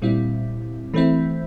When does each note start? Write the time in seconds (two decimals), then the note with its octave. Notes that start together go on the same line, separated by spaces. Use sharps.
0.02 A#2 G3 C4 E4
0.94 E3 A3 C4 E4